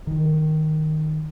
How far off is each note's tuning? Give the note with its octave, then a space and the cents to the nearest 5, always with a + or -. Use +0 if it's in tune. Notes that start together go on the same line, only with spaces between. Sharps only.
D#3 -5